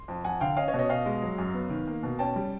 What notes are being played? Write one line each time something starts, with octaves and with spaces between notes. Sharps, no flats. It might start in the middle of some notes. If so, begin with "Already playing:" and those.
Already playing: C6
F2
F2 F#5 G#5
D3 F5 G5
C#4 D#5 F5
C#5 D#5
B2
C#5 D#5
B2 D#5 F5
G#3
F#3
F#2
B3
D#3
A#3
B2
C#4 G5 A5
G3